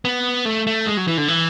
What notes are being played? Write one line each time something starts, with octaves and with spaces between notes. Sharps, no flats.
B3
A3
A3
G#3
F#3
E3
D3
E3